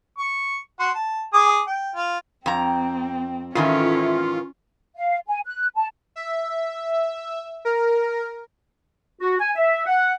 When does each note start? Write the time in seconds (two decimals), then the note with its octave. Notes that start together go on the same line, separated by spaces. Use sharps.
0.18 C#6
0.80 F#4 C6
0.95 A5
1.33 G#4 D6 D#6
1.67 G5
1.96 F4
2.46 F2 C4 G5 A#5
3.55 G#2 D#3 E3 C#4 F4 A4 E5
4.96 F5
5.28 G#5
5.46 F#6
5.76 A5
6.16 E5
7.65 A#4
9.21 F#4
9.40 G#5
9.56 E5
9.86 F#5